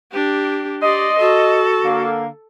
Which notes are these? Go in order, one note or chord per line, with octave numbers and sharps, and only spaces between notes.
D4 G4
G4 D5 D#5 C6
F#4 A4
D3 A#3